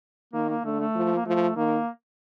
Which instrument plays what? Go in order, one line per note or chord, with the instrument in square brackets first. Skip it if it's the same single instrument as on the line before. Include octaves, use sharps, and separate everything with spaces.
[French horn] D#3 [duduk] A#3
[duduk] A#3
[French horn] D3 [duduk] A3
[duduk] A3
[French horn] F3
[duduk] A#3
[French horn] F3 [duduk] A3
[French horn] D#3 [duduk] A#3